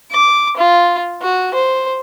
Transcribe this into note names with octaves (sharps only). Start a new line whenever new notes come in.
D6
F4
F#4
C5